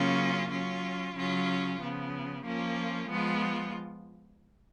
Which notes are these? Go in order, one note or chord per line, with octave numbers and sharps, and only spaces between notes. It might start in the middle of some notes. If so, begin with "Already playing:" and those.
Already playing: C#3 F#3 A#3 C#4 F4
F#3 C#4 F4
C#3 F#3 C#4 F4
C#3 F3 B3
F3 A#3 C#4 F4
F3 G#3 B3 F4